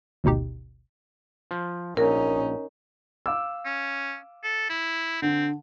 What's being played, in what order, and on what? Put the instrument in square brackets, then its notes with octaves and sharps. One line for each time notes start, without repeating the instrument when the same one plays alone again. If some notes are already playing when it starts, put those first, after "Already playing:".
[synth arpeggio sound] G#1 D2 B2 D#4 G4
[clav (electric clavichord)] F3
[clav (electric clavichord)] A#1 [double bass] C#4 D#4 [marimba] A#4
[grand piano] F5 D6 E6
[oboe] C#4
A4
E4
[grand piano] D3 [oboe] C4